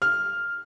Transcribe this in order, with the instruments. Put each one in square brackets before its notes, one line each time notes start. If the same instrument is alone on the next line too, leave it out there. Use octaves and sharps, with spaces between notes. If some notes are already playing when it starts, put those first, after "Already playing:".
[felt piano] F6